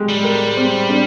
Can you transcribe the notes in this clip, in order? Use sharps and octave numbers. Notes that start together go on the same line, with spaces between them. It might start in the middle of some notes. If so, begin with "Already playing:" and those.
Already playing: G#3 G4
G3
A#4
C4
D4